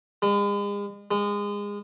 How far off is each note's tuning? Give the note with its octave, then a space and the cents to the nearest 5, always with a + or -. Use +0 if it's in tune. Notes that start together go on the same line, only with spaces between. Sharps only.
G#3 -40
G#3 -25